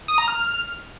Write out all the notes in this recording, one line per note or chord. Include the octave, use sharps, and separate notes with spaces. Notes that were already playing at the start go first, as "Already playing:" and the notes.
D#6
A#5
F6